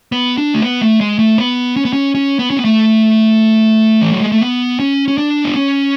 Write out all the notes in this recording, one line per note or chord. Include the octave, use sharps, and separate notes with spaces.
B3
D4
A3
B3
A3
G#3
A3
B3
C#4
B3
C#4
C#4
B3
C#4
B3
A3
E3
F#3
G#3
A3
B3
C#4
C#4
D4
B3
C#4